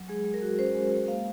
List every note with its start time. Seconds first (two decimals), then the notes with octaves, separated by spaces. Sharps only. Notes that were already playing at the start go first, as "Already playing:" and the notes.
Already playing: F#3
0.08 G#3 G#4
0.25 G#3
0.34 A#4
0.42 F#4
0.59 C#4 C5
0.75 G#3
0.92 G#3
1.08 A#3 F5